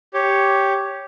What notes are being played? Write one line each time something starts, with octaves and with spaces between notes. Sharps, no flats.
G4 C#5